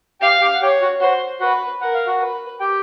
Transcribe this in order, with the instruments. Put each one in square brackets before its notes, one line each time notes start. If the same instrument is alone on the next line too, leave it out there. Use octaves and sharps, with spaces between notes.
[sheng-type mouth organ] G4 G5 [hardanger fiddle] F5
[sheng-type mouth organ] G4 G5
F#5
[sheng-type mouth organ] G4 G5 [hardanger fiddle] C#5
[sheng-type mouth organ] F#4 F#5
[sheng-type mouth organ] F#4 F#5 [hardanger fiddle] C5
[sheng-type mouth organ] F#4 F#5 [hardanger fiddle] B4
[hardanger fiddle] A#4 [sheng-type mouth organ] F#5
[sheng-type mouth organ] F5
F#4 F#5
[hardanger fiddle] B4
[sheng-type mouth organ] G4 G5